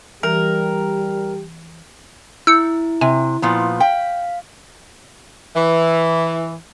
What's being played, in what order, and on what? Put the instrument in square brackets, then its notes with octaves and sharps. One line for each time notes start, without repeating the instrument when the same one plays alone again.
[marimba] E3 [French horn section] G3 G4 [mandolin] A#4
[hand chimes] E4 [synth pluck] E6 G6 C#7
[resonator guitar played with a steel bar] C3 [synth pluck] G#5
[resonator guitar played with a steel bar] A#2 F3 B3
[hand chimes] F5 [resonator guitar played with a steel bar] G5
[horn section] E3